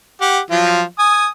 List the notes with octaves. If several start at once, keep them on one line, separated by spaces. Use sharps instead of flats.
G4 F#5
F3 F#3 F4
G#5 D#6